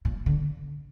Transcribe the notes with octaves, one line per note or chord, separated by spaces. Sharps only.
A#2
D3